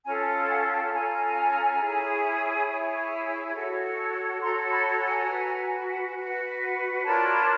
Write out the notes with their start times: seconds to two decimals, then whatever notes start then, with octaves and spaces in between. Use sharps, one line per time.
0.04 C#4 F4 A4 G#5 A#5
0.45 G5
0.48 F#5 G#5
0.70 G5 A5
0.91 C#4 F4 A4 G#5 A#5
1.79 E4 G#4 C#5
2.67 E4 G#4 C#5
3.54 F#4 A4 C#5
4.41 F#4 A4 C#5 A#5 C6
4.70 A5 B5
4.99 G#5 A#5
5.28 F#4 B4
6.16 F#4 B4
7.02 D4 F4 A#4 C#5 A5 B5